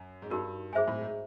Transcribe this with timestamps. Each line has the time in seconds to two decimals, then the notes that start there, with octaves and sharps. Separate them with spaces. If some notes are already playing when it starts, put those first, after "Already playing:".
Already playing: F#2
0.22 G#2
0.30 G2 D#4 F#4 A#4
0.73 G#2 G#4 C5 E5 G#5
0.88 A2
1.01 G#2